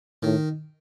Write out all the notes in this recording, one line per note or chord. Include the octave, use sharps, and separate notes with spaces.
A2 D#3